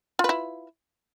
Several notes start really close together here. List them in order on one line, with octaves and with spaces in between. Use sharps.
F4 B4 E4